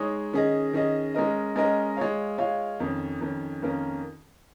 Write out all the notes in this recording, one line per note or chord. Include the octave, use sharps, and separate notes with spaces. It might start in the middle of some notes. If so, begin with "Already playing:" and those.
Already playing: G#3 D#4 G#4 C#5
D#3 C#4 G#4 D#5
D#3 C#4 G#4 D#5
G#3 C#4 A#4 D#5
G#3 C#4 A#4 D#5
G#3 F4 C#5 F5
G#3 F4 C#5 F5
F2 D#3 C#4
F2 D#3 C#4
F2 D#3 A#3 C#4 A#4